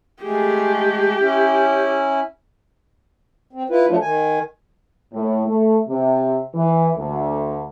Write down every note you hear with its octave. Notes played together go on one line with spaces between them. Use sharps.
G#3 A3 G4 G#4
C#4 E4
C4
E4 F4 B4
F3 F#3 A3 D4 F4
D#3 G#5
A2
A3
C3
E3
D2